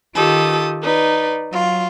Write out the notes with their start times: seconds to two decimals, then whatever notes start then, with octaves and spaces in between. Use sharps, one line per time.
0.15 D#3 F4 G4 A4 D#6
0.82 D#4 B4 D5
1.51 F#3 F4